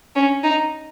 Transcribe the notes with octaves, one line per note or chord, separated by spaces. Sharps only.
C#4
D#4